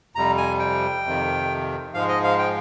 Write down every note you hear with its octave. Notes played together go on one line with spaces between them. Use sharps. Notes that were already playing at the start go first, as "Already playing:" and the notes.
F2 C3 G3 A#5
G#5
G5
F2 C3 D#3
G#2 F3 G#3 F5
D#5
F5
G5